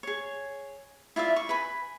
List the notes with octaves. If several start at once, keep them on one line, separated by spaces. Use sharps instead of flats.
G#4 C#5
E4 F4 D5 E5
C#6
B4 G#5 B5